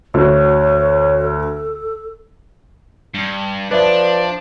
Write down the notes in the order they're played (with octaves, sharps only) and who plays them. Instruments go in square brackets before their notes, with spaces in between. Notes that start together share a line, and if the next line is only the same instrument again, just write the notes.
[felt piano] D2 F#4 [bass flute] C#5
[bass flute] A4
[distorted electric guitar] G2
[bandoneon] F3 [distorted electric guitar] D4 [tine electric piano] B4 D5 E5